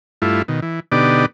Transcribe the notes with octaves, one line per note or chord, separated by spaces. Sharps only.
G2 A3 E4 F4
B2 D#3
E3
B2 D3 B3 D#4 G4 D5